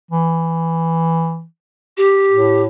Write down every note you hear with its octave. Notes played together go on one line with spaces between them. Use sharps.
E3
G4
A2